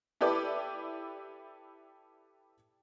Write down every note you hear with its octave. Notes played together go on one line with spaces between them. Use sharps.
E4 G4 A4 B4 D5 D6